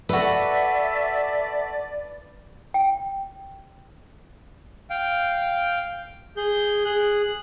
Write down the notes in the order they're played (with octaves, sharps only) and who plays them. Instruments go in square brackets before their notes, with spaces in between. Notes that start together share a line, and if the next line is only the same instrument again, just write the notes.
[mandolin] F#4 A4 [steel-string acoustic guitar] B4 [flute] D5 [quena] E5
[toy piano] G5
[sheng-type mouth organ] F5 G5
G#4 G6
G#4 F#6